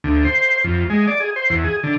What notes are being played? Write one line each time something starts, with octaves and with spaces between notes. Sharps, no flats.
D2
C5
F2
G#3
D5
G#4
C5
E2
G#4
D3